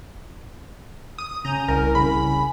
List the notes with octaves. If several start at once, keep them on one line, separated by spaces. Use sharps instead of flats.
D#6
C#3 C#4 A#5 G6 D#7
C2 A#4
C#3 B5